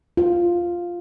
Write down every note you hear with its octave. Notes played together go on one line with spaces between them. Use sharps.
F4